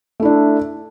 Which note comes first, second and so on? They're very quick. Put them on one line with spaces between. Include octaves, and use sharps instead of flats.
A3 E4 D4